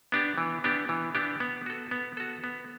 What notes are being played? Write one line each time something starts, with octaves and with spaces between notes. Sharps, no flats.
B3 D4 G4
E3
B3 D4 G4
E3
B3 D4 G4
B3
F#4 A4
B3
F#4 A4
B3